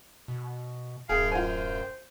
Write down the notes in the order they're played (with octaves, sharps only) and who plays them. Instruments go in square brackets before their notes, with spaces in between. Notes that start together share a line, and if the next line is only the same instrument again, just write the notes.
[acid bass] B2
[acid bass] D1 [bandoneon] F#2 G5 [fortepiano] G#4 [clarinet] F5
[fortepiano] F4 G#5 [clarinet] C5